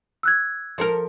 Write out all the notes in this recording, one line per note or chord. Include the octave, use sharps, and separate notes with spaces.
E6 F#6 G#6
F3 A4 A#4